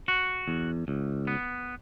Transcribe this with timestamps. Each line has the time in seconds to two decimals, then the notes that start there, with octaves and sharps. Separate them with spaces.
0.08 F#4
0.48 E2
0.88 C#2
1.27 B3